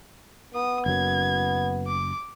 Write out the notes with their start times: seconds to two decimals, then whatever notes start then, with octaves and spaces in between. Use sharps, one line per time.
0.54 B3 D#6
0.86 F#1 F#2 G#6
1.87 D6